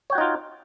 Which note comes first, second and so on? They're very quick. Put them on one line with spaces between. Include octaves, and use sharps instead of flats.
C#5 G5 F#4 D#4 F4